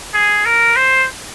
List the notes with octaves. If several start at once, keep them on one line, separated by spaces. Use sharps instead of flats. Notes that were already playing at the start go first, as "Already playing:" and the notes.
G#4
A#4
C5